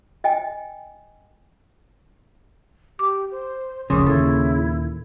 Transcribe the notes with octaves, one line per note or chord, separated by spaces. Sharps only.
D#5 G5 G#5
G4 D6
C5
F#1 D2 A#2 C#3 F3 C6 D#6
D#2 A#2 E4 A4